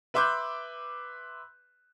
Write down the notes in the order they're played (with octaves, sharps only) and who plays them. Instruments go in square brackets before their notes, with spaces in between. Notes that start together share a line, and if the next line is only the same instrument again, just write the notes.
[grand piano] B4 E5 C6 D6 F#6 G6